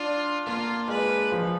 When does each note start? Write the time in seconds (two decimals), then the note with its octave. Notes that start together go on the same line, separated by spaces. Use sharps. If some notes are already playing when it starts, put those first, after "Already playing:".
Already playing: D4 F4
0.46 A#3 F4
0.88 G#3 B4
1.32 F3